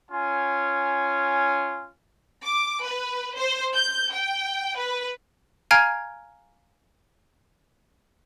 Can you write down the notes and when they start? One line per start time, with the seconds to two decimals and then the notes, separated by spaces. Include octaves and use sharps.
0.10 C#4 F4 G#5
2.44 D6
2.83 B4
3.36 C5
3.75 G6
4.13 G5
4.76 B4
5.71 F5 G#5 A#5 F6 G#6 D7